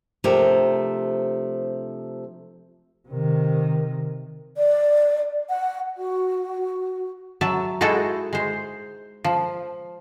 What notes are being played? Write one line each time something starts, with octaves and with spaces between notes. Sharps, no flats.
C3 F3 A3 D4 G4 A#4
C3 D#3
D5
F#5
F#4
F#3 E5 A5
G#3 D#4 E4 F#4 A4
G#3 C5
F3